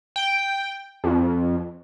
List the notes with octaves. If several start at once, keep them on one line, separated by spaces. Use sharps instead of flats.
G5
F2